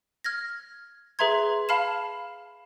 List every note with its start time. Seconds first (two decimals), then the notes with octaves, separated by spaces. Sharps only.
0.24 F6 G#6 A#6
1.19 G#4 B4 E5 A#5 C6 G#6
1.69 F5 A5 B5 F6 C7 E7